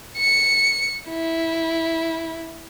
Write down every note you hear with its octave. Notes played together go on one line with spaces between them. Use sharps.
C#7
E4